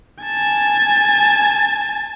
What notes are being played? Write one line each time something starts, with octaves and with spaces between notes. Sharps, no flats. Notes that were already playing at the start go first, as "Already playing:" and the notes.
G#5 A5